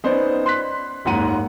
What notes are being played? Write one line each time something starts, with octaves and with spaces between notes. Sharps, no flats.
B3 C#4 D#4 C5 D5
C6 F#6 B6
F#1 D#2 G#2 F#5 D#7